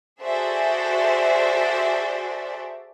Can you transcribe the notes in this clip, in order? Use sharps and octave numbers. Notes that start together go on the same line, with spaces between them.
F#4 G#4 A4 C5 D5 E5